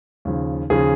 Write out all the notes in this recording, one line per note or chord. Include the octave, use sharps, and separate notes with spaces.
D#2 C#3 F3
D#2 C#3 F3 G#4